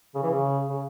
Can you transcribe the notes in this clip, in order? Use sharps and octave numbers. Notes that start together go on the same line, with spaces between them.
C#3
E3
C#3
C#3